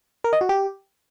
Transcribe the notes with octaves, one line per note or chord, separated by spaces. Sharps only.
A#4
D#5
F#4
G4